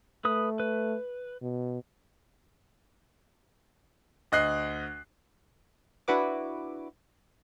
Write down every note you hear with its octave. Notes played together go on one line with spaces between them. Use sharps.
A3 B4 D#6
B4
B2
D2 D#5 F#6 C7
D4 E4 F#4 B4 D6